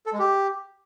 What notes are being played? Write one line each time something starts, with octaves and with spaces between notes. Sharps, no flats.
A4
G#3
G4